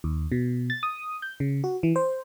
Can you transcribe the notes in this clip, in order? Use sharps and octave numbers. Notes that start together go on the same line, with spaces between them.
D#2
B2
A6
D#6
G6
C#3
F#4
E3
C5